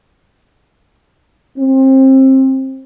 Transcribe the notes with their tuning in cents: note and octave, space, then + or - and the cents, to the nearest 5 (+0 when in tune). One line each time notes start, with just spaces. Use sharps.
C4 +25